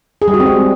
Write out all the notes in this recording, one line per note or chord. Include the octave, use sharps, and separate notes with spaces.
G#4
G3
F#4
C4
G#3